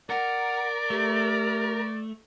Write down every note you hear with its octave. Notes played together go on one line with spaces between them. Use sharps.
A#4 D5 F#5
A3 G4